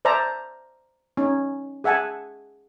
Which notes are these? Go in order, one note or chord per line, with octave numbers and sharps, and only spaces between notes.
C5 D5 E5 A5 A#5
C#4 D#4
G#4 E5 F#5 G#5 A5